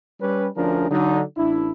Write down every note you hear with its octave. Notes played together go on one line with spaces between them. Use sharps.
G3 C#4 B4
D2 F3 C#4 D4 G#4 A#4
D3 F#3 D#4
A1 D4 E4